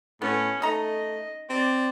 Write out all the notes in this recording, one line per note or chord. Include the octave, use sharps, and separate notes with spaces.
A2 B3 C#4
A3 D#4 D#5 A#5
C4 D5